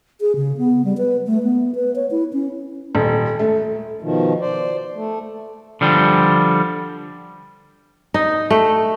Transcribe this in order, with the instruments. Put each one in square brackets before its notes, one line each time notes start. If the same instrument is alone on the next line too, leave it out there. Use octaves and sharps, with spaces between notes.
[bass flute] G#4
C#3
B3
G3
B4
A3
B3
B4
C#5
E4
C#4
[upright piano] D#1
A3
[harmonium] B2 D#3 F3
C5 D5
A3
[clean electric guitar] D3 F3 G3
[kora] D#4
A3